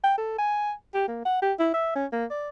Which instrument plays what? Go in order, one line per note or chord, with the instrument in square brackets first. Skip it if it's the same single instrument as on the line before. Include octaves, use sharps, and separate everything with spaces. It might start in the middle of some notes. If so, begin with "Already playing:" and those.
[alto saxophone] G5
A4
G#5
G4
A#3
F#5
G4
E4
E5
C#4
A#3
D5